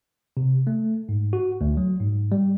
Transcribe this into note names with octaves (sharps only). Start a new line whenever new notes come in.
C3
A3
G#2
F#4
D2
F#3
G#2
G3